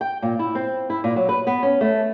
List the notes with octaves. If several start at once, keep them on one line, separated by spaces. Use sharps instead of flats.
G5
A#2
E4
C4
E4
A#2
F#3
B4
B3
C#4
A3